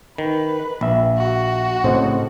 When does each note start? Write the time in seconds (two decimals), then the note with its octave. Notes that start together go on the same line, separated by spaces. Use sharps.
0.18 D#3 B4
0.81 A#1 A#2 E5
1.18 F#4
1.84 A2 C#3 C4 C5 D#5